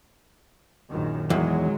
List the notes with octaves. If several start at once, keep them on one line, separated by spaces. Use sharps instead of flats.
A#1 F#2 D#3
E2 D#3 F#3 G#3